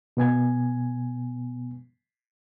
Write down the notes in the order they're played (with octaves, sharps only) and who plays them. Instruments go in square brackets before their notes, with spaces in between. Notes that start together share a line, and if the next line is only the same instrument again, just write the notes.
[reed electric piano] B2 B3 G#5 G#6